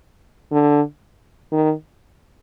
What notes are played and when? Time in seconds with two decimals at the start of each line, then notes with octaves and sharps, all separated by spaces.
0.52 D3
1.52 D#3